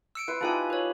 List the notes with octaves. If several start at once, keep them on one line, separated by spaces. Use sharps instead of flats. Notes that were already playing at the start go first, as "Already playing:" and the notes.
E6 C#7 D7
E4 B4 C6
F3 D#4 E4 G4 A4 G#5
B4 C#5